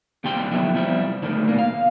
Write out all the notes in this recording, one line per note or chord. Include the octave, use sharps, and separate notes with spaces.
D#2 C3 G3 D4 G5 C6
D3 F3 F#3 B3 D4 E4
C3 F3 G3 E4
C#2 A2 D3 D#3 D4
B2 A#3
F5